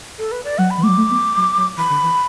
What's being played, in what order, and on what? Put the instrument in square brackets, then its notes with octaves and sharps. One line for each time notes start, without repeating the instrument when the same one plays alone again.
[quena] A4
B4
D5
[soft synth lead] F#3 [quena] F#5
[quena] B5
[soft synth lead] E3
[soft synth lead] F#3 A3 [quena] D6
[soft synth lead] A3
B3
F#3
F#3
[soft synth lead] E3 [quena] B5
[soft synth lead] D3
E3